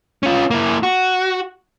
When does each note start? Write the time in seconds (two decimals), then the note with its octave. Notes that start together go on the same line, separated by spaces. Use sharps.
0.23 C#4 F4
0.51 A#3 E4
0.83 F#4